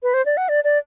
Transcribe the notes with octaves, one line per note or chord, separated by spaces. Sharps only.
B4
C5
D5
F#5
D5
D5